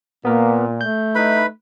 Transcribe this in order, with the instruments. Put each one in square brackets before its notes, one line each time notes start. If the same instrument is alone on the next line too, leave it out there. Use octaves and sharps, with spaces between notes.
[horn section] A#2 [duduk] A#3 [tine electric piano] B3 A#4
[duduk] A3 [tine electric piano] G6
[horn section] D#4 E4 [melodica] B4 B5